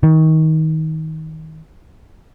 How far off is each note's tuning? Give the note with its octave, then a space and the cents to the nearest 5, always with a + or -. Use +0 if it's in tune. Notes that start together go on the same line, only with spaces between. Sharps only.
D#3 +25